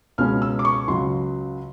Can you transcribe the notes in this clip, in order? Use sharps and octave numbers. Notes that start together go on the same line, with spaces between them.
C#2 B2 G#3 C#4 F6
E6
D6
C#6
C#2 C#3 F#3 C6